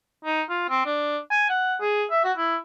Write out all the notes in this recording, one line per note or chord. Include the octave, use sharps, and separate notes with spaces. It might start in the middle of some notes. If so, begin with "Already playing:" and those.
D#4
F4
C4
D4
G#5
F#5
G#4
E5
F#4
E4